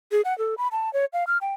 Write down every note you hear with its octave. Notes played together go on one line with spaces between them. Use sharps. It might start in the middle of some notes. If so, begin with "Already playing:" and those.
G#4
F#5
A4
B5
A5
C#5
F5
F6
G5